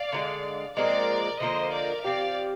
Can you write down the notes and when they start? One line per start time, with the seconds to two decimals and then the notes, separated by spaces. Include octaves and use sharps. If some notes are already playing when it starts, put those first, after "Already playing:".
Already playing: D5 F5
0.12 D3 F3 G#3
0.76 A#2 F3 G#3 C4 A#4 D5
1.40 D3 F3 A#3 D#4 C5 D#5
1.73 A#4 D5
2.04 F3 C4 G4 D5 F5